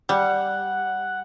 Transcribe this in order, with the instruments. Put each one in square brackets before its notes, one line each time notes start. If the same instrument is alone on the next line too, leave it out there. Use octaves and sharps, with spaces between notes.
[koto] G3 [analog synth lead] F#5